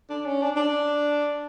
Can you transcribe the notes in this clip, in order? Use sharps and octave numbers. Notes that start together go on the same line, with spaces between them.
D4
C#4
D4
D4